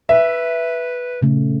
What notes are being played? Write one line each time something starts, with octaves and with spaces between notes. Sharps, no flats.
B4 E5
A#2 C#3 A3